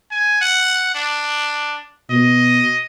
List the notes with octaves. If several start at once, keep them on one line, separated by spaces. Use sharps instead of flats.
G#5
F#5
D4
B2 D#5